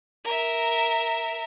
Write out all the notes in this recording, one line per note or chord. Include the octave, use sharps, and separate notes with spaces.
A#4 E5